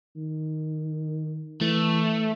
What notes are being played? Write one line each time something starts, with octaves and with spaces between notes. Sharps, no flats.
D#3
E3 A3